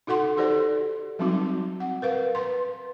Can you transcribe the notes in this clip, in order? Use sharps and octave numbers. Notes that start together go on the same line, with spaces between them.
D#4 F#4 A4 F#5 C6
D#4 G4 A4 C5 D5
F#3 G3 C4 D#4 F#4
F#5
A#4 B4 F5
B4 C6